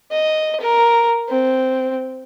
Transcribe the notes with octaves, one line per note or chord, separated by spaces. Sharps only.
D#5
A#4
C4